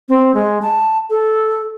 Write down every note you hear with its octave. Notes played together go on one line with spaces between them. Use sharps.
C4
G#3
A5
A4